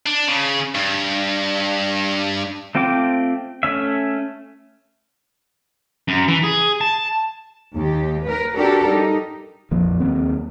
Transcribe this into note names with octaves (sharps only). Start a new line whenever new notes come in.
D4
C#3
G2
A3 C4 F4 G5 D6
A3 C#4 E5
F#2
E3
G#4
A5
D#2 G4
A#4 B4
D4 F#4 G4 A4 A#4
G3 D#4
A#1 F2 F3 A#3
D#2 F#3 A#3 C4